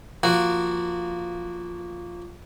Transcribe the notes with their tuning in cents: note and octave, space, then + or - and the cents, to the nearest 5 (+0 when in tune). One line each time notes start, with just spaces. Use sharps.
F3 +0 A#3 -5 F#4 +0